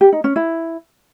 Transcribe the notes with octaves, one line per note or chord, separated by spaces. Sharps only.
G4
D#4
C#4
E4